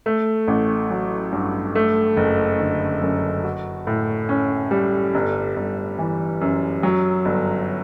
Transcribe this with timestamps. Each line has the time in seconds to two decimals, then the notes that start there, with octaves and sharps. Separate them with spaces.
0.06 A3
0.48 A1
0.90 F#3
1.32 G2
1.75 A3
2.17 F#1
2.60 D3
3.02 F#2
3.44 F#4
3.87 A2
4.29 C#4
4.71 G3
5.14 G1
5.56 G1
5.98 E3
6.41 F#2
6.83 F#3
7.25 G1